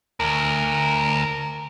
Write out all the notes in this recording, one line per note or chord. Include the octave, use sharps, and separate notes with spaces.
D2 A#4